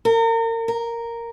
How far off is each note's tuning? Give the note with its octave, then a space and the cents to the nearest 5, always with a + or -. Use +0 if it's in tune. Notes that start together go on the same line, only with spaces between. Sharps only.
A#4 -35
A#4 -5